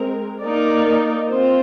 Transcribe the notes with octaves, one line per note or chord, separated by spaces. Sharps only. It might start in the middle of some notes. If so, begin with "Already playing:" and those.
Already playing: G#3 C4 A#4
A#3 D#4 A#4 D5
C4 F4 C5